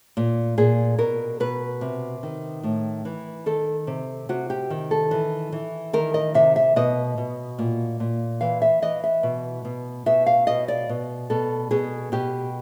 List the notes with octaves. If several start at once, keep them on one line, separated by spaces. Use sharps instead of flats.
A#2
A#2 G#4
B2 A#4
B2 B4
C3
D#3
A2
E3
D#3 A4
C3
C3 F#4
G4
D#3
A4
E3
E3
D#3 A#4
D#5
C3 E5
E5
B2 D#5
B2
A#2
A#2
E3 F5
E5
E3 D#5
E5
B2
B2
B2 E5
F5
B2 D#5
D5
B2
B2 A4
B2 G#4
B2 G4